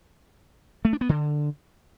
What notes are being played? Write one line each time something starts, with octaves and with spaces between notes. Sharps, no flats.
A3
D4
B3
D3